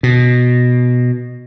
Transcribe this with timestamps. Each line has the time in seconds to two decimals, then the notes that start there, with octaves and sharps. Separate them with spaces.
0.03 B2